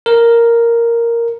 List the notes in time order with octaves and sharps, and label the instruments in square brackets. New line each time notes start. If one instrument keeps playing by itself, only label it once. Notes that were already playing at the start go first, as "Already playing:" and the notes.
[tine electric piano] A#4